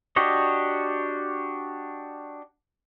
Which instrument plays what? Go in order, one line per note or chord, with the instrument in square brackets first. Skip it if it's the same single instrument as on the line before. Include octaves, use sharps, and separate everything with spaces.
[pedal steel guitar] D4 F#4 G4 C#5 D#5